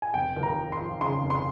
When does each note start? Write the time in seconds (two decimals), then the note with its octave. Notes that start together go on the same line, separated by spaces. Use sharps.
0.02 G#5
0.14 F1 G5
0.36 D#2
0.43 A#5
0.58 F3
0.72 C6
0.80 F3
1.01 C#3 C6
1.23 F1
1.30 C6